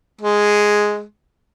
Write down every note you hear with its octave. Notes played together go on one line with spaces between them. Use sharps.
G#3